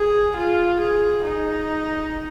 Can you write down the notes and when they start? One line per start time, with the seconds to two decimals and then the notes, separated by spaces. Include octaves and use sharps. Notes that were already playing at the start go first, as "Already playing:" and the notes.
Already playing: G#4
0.37 F4
0.81 G#4
1.25 D#4